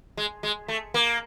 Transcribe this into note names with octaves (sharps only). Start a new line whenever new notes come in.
G#3
G#3
A3
A#3